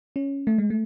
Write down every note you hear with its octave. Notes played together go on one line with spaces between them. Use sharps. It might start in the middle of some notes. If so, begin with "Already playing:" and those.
C#4
A3
G#3
A3